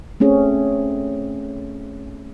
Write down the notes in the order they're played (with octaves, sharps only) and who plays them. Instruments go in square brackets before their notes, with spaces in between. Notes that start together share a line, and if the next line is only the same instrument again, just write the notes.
[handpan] A3 C4 C#4 G#4